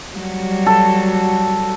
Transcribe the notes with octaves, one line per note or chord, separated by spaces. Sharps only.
F#3 G3 F#4
A4